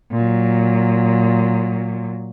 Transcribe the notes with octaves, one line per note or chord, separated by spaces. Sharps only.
A#2 F#3